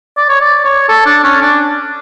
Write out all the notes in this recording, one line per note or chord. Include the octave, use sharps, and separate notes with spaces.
D5
C#5
D5
C#5
A4
D4
C#4
D4